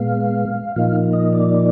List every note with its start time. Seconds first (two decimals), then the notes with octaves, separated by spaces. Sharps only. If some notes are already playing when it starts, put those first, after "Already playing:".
Already playing: A#2 G#3 B3 F5
0.76 A#2 F3 A#3 D#4 F5
1.13 D#5
1.33 D5